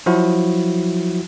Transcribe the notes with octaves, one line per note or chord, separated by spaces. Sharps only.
F3 F#3 E4 F#4